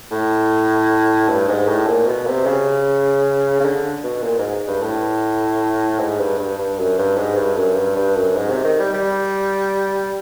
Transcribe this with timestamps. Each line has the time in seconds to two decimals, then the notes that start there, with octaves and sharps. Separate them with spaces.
0.11 A2
1.29 G2
1.48 G#2
1.68 A2
1.87 A#2
2.07 B2
2.27 C3
2.46 C#3
3.60 C#3
3.65 D3
4.04 B2
4.23 A#2
4.38 G#2
4.67 G2
4.82 A2
6.00 G#2
6.20 G2
6.39 G2
6.58 G2
6.79 F#2
6.99 G2
7.17 G#2
7.37 G2
7.57 F#2
7.76 G2
7.96 G2
8.16 F#2
8.36 G#2
8.50 C3
8.65 D#3
8.80 G3
8.94 G3